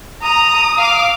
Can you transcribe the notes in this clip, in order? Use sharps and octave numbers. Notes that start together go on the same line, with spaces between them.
A#5 D#6
F5 D6